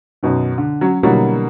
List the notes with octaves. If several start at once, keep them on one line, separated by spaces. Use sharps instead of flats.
F#2 B2 D#3
D3
F#3 C#4
B2 D3 E3 F#3 G3 A#3